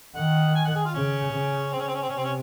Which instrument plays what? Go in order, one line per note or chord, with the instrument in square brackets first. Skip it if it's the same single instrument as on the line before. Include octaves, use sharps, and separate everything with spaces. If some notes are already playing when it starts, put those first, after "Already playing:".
[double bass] D#3 [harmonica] F#5
[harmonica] G#5
F#5
G#4
F4
[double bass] C#3 [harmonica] C#4
[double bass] C#3
[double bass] C#3 [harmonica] C4
[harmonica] C#4
C4
C#4
C4
C#4
[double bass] C3
[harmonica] C4
C#4